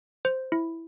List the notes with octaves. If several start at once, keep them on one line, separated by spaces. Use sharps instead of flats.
C5
E4